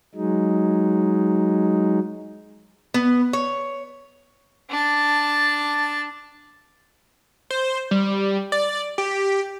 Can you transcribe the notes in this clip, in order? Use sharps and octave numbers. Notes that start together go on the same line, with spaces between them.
F#3 G#3 D#4
B3
C#5
D4 A5
C5
G3
D5
G4